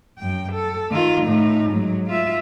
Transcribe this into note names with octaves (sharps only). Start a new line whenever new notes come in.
F#2 G5
A4
D#3 F4
A2 D#4
G#2 F#3
F4 E5